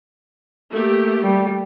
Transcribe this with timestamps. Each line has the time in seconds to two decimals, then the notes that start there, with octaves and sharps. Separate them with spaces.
0.71 A3 A#3 G4
1.23 G3